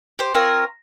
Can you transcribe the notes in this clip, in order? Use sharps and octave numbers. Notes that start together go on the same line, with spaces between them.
G4 C5
C4 F4 A#4 C#5